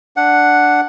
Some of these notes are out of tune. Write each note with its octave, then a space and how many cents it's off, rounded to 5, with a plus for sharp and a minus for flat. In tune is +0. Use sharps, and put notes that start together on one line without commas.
D4 +0 F#5 +0